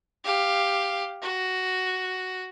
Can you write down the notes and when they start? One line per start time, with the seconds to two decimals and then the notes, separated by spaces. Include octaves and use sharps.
0.24 G4 F5
1.22 F#4